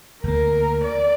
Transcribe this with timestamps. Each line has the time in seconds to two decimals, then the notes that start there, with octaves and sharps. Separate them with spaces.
0.24 D2 A#3 A#4
0.84 D5